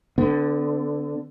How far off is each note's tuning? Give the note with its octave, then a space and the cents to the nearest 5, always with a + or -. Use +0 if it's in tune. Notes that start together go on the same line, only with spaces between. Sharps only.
D3 +0 B3 +40